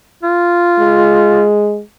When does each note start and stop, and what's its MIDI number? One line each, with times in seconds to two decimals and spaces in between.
0.23 1.46 65
0.79 1.82 56